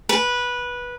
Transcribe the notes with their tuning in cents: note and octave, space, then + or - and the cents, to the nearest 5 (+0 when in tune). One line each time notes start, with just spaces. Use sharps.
B4 -15